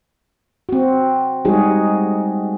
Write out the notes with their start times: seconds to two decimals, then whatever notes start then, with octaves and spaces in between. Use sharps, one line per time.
0.69 C4 F#4
1.45 G3 G#3 D#4 F#4 G#4